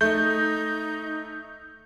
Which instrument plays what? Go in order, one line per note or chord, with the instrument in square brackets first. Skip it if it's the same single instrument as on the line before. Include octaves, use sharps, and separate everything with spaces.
[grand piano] A3 [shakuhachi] D#4 [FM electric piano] G6